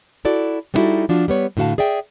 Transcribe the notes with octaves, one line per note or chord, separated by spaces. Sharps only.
E4 F#4 A4 D5
G3 B3 D#4 E4 F#4 A4
F3 D4 F4 F#4
G3 B3 C#5
A2 D3 F#4 F5 A5
G#4 D5 E5 G5